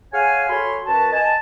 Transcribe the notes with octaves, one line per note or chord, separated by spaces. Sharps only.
G#4 C#5 F5 F#5 G#5
F#4 A4 C#5 G#5 B5 C6
F#2 F#4 B4 A5
D#5 G#5 A5